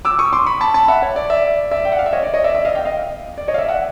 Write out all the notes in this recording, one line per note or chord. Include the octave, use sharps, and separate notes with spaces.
D6 E6
C#6 D#6
C6 D6
B5 C#6
A5 B5
A5 B5
E5 F#5
C#5
D5
D5 E5
D5 E5
G5
F#5
F5
E5
C#5 D#5
D5
C#5 D#5
D5 E5
D5 E5
D#5 F5
F5 G5
D#5 F5
D5
C#5 D#5
F5
D5 E5
E5 F#5